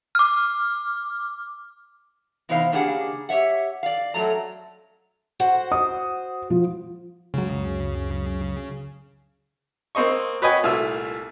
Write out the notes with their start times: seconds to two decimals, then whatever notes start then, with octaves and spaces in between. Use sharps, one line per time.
0.15 D6 F6
2.49 C3 E3 B3 D#4 C5 F5
2.72 C#3 A#3 D4 G4 G#4 F#5
3.29 G4 C#5 E5 F#5
3.83 D5 F5
4.14 F#2 F#3 A3 A#5
5.40 F#4 C5 F#5
5.72 D#6
6.50 F3
7.34 C#2 F#2 C#3 F#3
9.95 A#3 C4 C5 D#5 C#6
10.42 F#4 B4 C#5 D#5 G5 G#5
10.63 C2 A#2 A3 E5